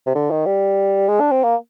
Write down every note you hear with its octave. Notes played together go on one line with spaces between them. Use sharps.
C3
D3
D#3
G3
G#3
D4
C4
A#3